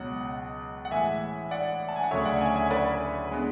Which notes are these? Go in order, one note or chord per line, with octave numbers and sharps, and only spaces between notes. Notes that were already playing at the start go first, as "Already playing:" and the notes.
Already playing: C#2 B2 F#3 F#5
F#5
A2 E3 G#3 E5 G#5
D5 F#5
A5
G#5
F#5
D2 C#3 F#3 A3 C#5 E5
D5 F#5
E5 G#5
E5 G#5
B4 D5
G#3 B3 D4